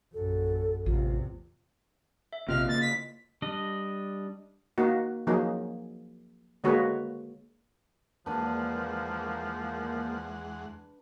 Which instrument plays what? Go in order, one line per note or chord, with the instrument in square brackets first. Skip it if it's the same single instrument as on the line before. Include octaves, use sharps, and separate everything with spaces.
[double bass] A#1 F#2 [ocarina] A4
[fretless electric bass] A1 [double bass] E2 C3 [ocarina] F4
[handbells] E5
[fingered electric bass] A#1 C3 C4 [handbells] F4 D#5 F5 [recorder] F6
[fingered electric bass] C#3 A#3 [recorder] A6
[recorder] B6
[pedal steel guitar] G3 D4 D#5
[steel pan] A#3 D#4 F#4
F3 F#3 A#3 D#4 G#4
D3 G#3 A#3 F#4 B4 C#5
[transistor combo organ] E2 G#3 F#5 [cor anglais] F3 [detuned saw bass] A#3 [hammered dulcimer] D4 B4